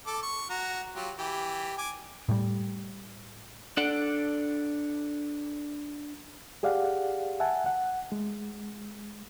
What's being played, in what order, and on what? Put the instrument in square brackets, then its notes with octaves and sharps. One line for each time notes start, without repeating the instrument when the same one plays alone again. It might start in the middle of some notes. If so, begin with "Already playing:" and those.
[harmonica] A4 D6
C#6
F#4 A#5
F#3 F4 G4
E3 G4
G#5 D6
[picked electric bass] A2 G3
[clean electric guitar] D4 A4 D5 F#5
[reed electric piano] G4 G#4 D5 F5 F#5
E5 F#5 G#5 A5
F#5
G#3